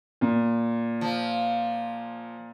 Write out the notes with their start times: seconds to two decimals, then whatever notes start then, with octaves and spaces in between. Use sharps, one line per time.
0.21 A#2
1.01 F3